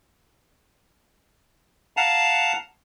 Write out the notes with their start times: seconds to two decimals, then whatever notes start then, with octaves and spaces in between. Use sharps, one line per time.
1.97 F5 F#5 A5 A#5